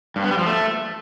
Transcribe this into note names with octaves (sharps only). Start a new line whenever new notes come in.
G2
B3
G3
F3
A3